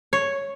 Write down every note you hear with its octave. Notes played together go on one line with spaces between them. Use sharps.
C#5